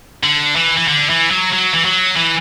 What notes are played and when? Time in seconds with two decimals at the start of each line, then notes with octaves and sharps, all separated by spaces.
0.23 D3
0.56 E3
0.77 E3
0.88 D3
1.09 E3
1.30 F#3
1.52 F#3
1.74 E3
1.84 F#3
2.16 E3